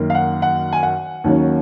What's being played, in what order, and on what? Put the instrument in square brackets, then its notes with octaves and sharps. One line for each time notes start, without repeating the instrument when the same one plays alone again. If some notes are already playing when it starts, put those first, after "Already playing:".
Already playing: [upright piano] F#2 D#3 A#3
F5
F#5
F#5
G#5
F#5
D#2 D#3 F#3 C#4